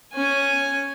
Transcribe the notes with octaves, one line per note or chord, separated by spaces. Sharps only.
C#4 G#5